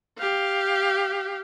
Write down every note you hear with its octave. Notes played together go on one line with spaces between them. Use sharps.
G4 F5